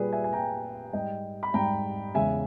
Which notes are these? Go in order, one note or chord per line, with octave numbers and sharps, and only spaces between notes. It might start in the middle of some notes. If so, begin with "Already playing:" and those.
Already playing: A#2 G3 G#4 B4
E5 G#5
G#5
A#2 G3 G5 A#5
G#2 G3 D#5 G5
B5
G#2 G3 G5 A#5
E2 C#3 G#3 E5 G#5